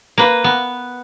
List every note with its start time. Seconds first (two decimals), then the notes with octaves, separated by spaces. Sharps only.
0.18 A#3 B4
0.44 B3